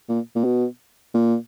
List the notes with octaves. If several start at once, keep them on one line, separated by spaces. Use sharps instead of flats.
A#2
A#2
B2
A#2